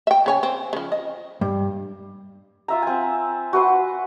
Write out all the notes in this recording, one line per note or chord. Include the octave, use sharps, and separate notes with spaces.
E5 G5
C#3 C#5 G#5
C4
C#3 F3
D#5
G2
F4 E5 A#5
C4 G#5
F#4 B4 C6